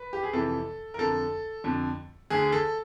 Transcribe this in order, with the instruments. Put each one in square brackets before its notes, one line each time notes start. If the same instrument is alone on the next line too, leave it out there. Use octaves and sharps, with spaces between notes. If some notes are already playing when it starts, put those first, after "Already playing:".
Already playing: [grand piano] B4
G4
G#4
F2 C3 E3 A4
A#4
F2 D3 A4
F2 D3
D2 D3 G#4
A4